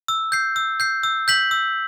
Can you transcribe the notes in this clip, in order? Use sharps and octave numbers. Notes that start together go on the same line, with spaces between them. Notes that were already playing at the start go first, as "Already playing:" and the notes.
E6
G6 C7
E6
G6 C7
E6
G6 B6 F#7
E6